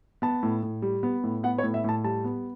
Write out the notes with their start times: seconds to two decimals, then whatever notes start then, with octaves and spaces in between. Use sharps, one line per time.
0.22 B3 A5
0.43 A2
0.63 A2
0.82 G3
1.03 B3
1.23 A2
1.43 B3 F#5
1.58 C#5
1.63 A2
1.74 E5
1.84 A2 A5
2.04 G3 A5
2.24 B3